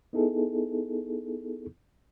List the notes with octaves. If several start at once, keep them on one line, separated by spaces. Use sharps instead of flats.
B3 D#4 E4 G#4 A4